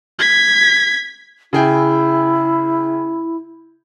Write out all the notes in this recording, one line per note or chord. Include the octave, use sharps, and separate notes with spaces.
G#6 B6
C#3 E4 G#4 G5